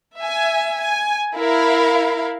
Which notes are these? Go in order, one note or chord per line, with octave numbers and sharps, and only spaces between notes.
E5 G#5
G#5
E4 A#4 F5